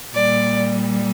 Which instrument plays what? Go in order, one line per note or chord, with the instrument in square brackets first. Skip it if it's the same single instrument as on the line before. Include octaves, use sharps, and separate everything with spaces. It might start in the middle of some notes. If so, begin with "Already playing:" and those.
[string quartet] A#2 G3 D5